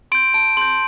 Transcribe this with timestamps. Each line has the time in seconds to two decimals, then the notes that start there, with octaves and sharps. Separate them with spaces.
0.12 C6 G6 D7
0.34 A5 D7
0.57 C6 G6